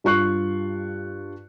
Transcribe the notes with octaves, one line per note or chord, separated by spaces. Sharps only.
G2 F4 C#6 F#6 C7